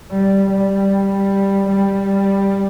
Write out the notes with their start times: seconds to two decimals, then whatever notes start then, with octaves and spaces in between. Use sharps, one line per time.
0.11 G3
0.51 G3
1.69 G3